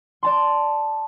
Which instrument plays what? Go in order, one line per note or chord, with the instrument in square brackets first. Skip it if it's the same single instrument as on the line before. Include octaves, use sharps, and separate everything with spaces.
[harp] D5 A5 C6